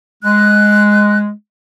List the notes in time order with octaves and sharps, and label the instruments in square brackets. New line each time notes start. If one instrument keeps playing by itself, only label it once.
[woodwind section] G#3 [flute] F#6